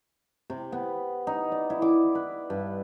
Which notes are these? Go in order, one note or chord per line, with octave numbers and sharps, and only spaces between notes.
C3
B3
D#4
D5
E4
D6
B4
G2